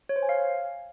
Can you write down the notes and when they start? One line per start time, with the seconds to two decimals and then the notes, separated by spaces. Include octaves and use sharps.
0.09 C#5
0.16 C5
0.23 G#5
0.29 F5